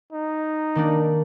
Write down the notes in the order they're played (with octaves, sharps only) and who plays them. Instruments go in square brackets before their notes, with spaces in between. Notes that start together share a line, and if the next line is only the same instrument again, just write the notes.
[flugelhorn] D#4
[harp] D#3 A#3 D4